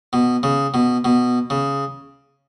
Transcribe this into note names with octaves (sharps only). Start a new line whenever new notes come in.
B2
C#3
B2
B2
C#3